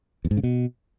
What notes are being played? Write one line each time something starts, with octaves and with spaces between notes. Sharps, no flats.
E2
G#2
C#3
B2